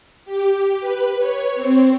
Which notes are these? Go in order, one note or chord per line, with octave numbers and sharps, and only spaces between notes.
G4
B4
C#5
C4